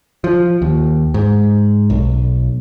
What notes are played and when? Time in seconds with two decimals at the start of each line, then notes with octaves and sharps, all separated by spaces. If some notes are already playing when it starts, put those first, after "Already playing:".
0.24 F3
0.62 D#2
1.14 G#2
1.90 B1